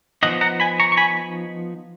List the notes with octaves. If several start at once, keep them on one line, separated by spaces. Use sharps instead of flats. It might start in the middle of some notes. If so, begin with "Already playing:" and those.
F3 B3 D#4 D#5 F#5
F#5 A#5
G#5 B5
A#5 C#6
C#6
G#5 B5